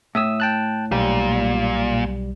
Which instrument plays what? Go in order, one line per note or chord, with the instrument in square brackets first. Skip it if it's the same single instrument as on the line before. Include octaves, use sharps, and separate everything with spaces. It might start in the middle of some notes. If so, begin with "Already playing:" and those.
[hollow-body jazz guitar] A2 [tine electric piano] E5 D#6 E6
[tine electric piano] G5 A5 F#6
[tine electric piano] B1 G3 [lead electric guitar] A#2